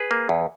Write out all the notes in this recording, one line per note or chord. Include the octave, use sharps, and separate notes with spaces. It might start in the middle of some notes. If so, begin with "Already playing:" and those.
Already playing: G#4 B4
A#3
E2